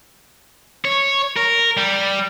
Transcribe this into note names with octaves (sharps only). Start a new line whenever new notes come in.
C#5
A#4
G3